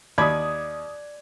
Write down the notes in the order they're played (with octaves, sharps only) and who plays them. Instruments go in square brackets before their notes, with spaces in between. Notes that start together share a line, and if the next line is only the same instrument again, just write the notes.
[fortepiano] D#2 B5 [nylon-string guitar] D5 [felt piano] D#6 G#6